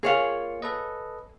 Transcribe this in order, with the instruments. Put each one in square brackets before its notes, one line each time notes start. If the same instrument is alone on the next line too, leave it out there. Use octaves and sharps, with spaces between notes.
[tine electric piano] A#3 F4 [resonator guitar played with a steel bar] G#4 C#5 F5
[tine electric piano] A4 B4 D#5